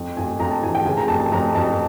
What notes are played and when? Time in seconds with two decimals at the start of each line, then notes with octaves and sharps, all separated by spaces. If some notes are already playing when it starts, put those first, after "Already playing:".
Already playing: F2
0.17 F2 G#5
0.39 F2 A#5
0.51 A5
0.63 E3 G#5
0.75 G5
0.85 C#3 G#5
0.97 A#5
1.08 F2 A5
1.20 A5
1.32 F2 A#5
1.54 F2 A5